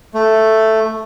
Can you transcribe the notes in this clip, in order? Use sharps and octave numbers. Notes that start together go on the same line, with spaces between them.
A3